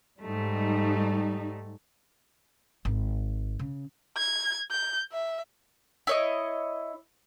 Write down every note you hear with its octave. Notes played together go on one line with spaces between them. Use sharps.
G#2 G3 A3 D#4
G#1
C#3
G#6
G6
E5
E4 C#5 D#5